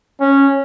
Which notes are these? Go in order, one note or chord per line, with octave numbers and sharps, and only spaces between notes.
C#4